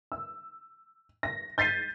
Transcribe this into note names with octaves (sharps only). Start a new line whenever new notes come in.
E6
A#6
G6 A6 B6 C7 D#7